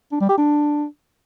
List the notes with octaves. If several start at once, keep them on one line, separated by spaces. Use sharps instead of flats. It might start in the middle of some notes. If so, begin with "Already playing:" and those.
D4
G3
G4
D4